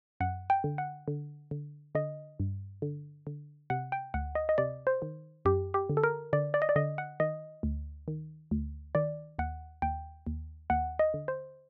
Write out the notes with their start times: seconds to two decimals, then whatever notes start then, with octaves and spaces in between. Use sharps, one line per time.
0.20 F#2 F#5
0.50 G5
0.64 D3
0.78 F#5
1.08 D3
1.51 D3
1.95 D3 D#5
2.40 G2
2.82 D3
3.27 D3
3.70 C3 F#5
3.92 G5
4.14 D2 F#5
4.35 D#5
4.49 D#5
4.58 C3 D5
4.87 C5
5.02 D#3
5.45 F#2 G4
5.74 G4
5.89 D3
5.97 A4
6.04 A#4
6.33 D3 D5
6.54 D5
6.62 D#5
6.69 D5
6.76 D3 D#5
6.98 F#5
7.20 D#3 D#5
7.63 D2
8.08 D#3
8.51 D2
8.95 D#3 D5
9.39 D#2 F#5
9.82 D#2 G5
10.27 D#2
10.70 D#2 F#5
10.99 D#5
11.14 D3
11.28 C5